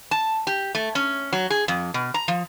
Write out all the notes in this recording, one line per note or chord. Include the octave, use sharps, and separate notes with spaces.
A5
G4
A3
C#4
F#3
G#4
F2
B2
A#5
F3